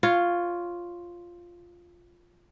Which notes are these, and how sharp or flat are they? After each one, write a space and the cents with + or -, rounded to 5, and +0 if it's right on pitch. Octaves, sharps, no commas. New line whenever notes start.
F4 +0 C#5 +0